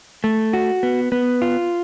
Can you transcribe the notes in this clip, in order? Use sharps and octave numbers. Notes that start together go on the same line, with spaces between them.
A3
F#4
B3
B3
F4